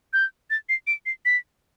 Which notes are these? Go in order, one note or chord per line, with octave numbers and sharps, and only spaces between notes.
G6
A6
C7
D7
C7
B6